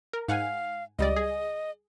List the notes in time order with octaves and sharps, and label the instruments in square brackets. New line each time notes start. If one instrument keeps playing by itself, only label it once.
[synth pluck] A#4
[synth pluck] G#2 F#5 G#5 [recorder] F5
[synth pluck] C#2 G3 D5 [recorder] D#5
[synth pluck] G#4